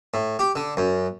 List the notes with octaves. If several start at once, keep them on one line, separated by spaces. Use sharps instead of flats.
A2
G4
D3
F#2